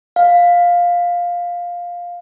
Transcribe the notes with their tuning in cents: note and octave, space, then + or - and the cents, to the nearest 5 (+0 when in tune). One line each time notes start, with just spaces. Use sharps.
F5 +10